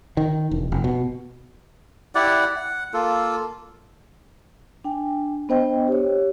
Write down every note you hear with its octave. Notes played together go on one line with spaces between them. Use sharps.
D#3
E1
F1
B2
E4 G4 D5 F#5
F#5
A#3 F4 A4
D4 G5 G#5
B3 D4 C5 D#5 G5
G4 C#5